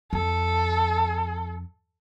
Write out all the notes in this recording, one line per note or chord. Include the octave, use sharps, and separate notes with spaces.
F2 A4